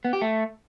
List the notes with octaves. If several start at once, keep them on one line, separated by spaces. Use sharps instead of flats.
B3
G4
A3